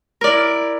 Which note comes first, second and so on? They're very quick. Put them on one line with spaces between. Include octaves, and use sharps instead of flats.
A#4 D5 E4